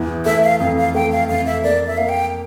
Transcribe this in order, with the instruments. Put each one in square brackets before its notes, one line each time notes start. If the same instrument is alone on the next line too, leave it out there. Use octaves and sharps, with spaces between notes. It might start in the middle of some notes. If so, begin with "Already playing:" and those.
Already playing: [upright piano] E2 E3
[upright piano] A3 [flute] E5
[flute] F5
[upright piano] F2 [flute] F5
[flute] F5
[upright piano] A3 [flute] G5
[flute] F5
[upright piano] F2 [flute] F5
[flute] E5
[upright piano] A#3 [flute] D5
[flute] E5
[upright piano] A#3 [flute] F5
[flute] G5